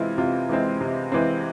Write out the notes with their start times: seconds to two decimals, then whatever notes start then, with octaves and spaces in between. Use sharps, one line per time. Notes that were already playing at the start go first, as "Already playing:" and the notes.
Already playing: C3 E3 G#3 C4 E4 F4
0.18 C3 F4
0.49 E3 G#3 C4
0.81 C3
1.12 E3 G#3 C4